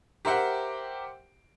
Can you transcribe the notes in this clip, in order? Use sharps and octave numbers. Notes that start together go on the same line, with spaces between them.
G4 A#4 C5 E5 F#5 G5